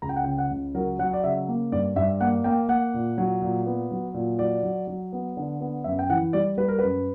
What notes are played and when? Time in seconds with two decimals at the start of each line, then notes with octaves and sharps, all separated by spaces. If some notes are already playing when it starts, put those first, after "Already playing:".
0.02 C#2 A#5
0.09 G5
0.16 F#5
0.24 C#3 G5
0.38 F#5
0.51 C#2
0.75 F#3 A#4
0.99 F#3 F#5
1.13 D5
1.24 C#3 E5
1.48 A#3
1.72 G2 D5
1.96 G2 E5
2.21 A#3 F#5
2.44 A#3 G5
2.69 A#3 F#5
2.94 A#2
3.18 F#3
3.42 A#2
3.66 B3
3.91 F#3
4.14 A#2
4.39 F#3 D5
4.63 F#3
4.87 F#3
5.13 B3
5.37 D3
5.61 B3
5.84 F#2 E5
5.99 G5
6.10 E3 F#5
6.33 G3 D5
6.57 G3 B4
6.68 A#4
6.79 F#2 B4